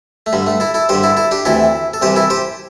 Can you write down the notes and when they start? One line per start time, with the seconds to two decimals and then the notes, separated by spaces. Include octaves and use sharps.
0.26 A3
0.33 G2 D3 G3
0.46 A3
0.60 E4 A4
0.74 E4 A4
0.89 G2 D3 G4 C5
1.03 E4 A4
1.17 E4 A4
1.31 D4 G4
1.45 D2 C3 E3 E4 A4
1.94 A4
2.02 C2 C3 E3 G4 C5
2.16 E4 A4
2.30 G4 C5